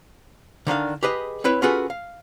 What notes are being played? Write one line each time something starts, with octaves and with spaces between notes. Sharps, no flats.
D3 D#3 D4 F5
G4 G#4 B4 D#5
C4 E4 B4 C#5
C#4 F4 F#4 G#4 A4 B4
F5